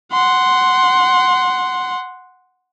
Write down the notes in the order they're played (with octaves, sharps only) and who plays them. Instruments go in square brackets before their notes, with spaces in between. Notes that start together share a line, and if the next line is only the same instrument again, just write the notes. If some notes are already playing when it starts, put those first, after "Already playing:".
[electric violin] F#5 C6